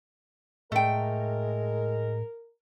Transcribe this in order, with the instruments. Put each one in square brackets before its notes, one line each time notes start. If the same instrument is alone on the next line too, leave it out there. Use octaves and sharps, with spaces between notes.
[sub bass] A2 [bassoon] G#3 [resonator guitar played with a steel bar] A3 G5 [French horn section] A#4